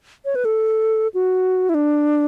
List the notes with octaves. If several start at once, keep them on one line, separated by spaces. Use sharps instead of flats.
C#5
B4
A4
F#4
E4
D4